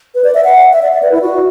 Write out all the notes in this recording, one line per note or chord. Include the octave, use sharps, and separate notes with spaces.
B4
D5
E5
F#5
E5
D5
D5
B4
E4
F#4